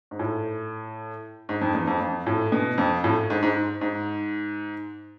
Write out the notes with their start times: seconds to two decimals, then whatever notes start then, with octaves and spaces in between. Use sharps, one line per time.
0.11 G#2
0.19 A2
1.49 G#2
1.61 F2
1.74 E2
1.87 F2
2.01 F2
2.27 A2
2.52 B2
2.78 F2
3.04 A2
3.30 G#2
3.43 G#2
3.81 G#2